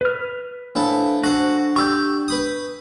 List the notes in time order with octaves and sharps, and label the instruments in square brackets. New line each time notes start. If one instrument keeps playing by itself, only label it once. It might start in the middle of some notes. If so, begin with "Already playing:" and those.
[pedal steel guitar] B4 F6
[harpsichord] A2 E4 A5 [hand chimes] D4 C5 F5
[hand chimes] D4 [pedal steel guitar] F#4 [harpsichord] A4 C5 F#5
[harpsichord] G4 D5 [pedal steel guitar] C#6 E6 G6
[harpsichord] B4 B5 D#6